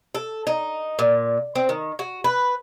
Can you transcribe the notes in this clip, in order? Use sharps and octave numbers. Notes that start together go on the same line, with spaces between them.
A4
D#4
A#2
C4
D#3
F#4
B4